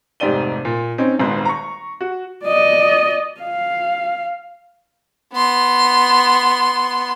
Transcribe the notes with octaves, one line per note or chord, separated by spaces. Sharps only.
F1 G#2 G4 D5 D#7 G7
A#2
C4 C#4 D#4
D#1 G#1 G#2 B3 C6
A#5 C#6
F#4
D5 D#5
F5
B3 C6